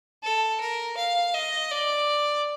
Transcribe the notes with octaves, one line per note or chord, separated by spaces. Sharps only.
A4
A#4
F5
D#5
D5